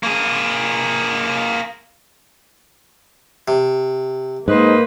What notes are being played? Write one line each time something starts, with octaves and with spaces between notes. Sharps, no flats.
A#3 G#4
C3
G#2 A#3 B4 C5 D#5